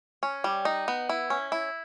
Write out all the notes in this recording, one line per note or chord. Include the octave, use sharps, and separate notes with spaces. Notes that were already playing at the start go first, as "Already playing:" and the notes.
C#4
G3
D#4
B3
E4
C#4
E4